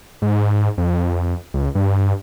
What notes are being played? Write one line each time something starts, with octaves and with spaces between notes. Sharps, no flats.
G#2
F2
C#2
G2